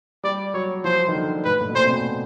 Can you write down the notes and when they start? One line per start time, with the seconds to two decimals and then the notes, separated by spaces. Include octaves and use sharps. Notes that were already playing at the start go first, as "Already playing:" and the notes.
0.24 G3 D5
0.54 F#3 C#5
0.84 F3 C5
1.08 D#3
1.15 D3
1.45 A2 B4
1.61 A2
1.70 B2
1.75 A#2 C5
1.84 C3
1.91 B2